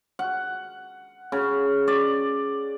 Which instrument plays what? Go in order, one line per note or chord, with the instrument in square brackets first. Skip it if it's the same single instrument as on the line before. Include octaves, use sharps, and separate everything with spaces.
[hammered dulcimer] F#5
C#3
D5